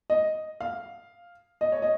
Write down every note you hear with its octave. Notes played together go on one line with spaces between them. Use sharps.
D#5
F5
D#5
C#5
D#5